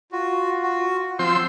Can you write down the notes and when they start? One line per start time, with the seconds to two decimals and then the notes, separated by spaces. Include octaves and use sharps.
0.12 F4 F#4
0.63 F#4
1.19 F3 C4 C6 E6 G6